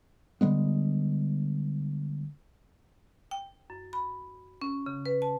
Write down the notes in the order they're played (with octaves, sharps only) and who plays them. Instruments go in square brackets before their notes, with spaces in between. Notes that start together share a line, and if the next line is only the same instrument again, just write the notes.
[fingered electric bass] D3 G3 G#3 B3
[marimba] G5
F#2
B5
C#4
C#3
B4
A5